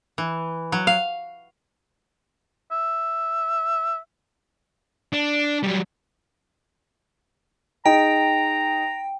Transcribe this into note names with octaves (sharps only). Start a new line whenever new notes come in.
E3
F#3
F5
E5
D4
F#3 G3
D#4 G#4 D#5 G5 A#5